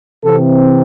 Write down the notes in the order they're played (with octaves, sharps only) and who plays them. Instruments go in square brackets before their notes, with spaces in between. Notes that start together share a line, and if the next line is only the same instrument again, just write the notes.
[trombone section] C3 E3 C4 A4